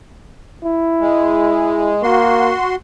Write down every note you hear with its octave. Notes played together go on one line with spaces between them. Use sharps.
E4
G#3
A#3 F#4 C6